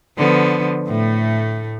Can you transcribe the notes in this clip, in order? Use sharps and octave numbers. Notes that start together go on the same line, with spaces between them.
D3 F3 B3
A2 A3